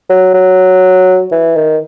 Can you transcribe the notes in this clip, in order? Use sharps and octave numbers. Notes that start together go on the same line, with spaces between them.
F#3
F#3
E3
D#3